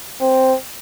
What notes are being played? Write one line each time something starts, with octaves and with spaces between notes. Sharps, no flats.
C4